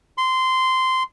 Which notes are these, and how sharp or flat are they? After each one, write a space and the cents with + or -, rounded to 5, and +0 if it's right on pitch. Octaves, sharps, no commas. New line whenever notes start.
C6 -15